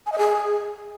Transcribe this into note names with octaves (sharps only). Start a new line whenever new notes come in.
G#5
D#5
G#4